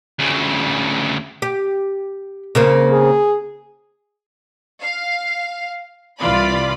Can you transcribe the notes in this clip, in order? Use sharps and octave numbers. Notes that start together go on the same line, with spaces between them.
D2 C#3
G4
C#3 A#3 C4
G#4
F5
C2 E3 F4 D5 B5